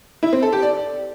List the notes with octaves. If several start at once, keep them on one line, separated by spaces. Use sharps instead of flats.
E4
C4
A4
G4
D5